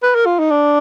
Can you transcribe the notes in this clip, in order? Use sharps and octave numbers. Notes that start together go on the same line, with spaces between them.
B4
A#4
F4
D#4
D4